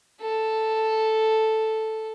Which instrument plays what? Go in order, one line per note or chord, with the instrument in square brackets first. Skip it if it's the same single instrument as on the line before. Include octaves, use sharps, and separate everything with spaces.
[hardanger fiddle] A4